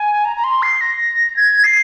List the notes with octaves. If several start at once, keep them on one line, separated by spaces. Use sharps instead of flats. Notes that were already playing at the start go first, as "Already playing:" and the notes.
Already playing: G#5
A#5
A#5
C6
C7
A#6
G#6
C7